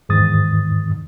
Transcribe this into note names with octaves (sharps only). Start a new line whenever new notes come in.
E2 G#2 D#3 D#6 A6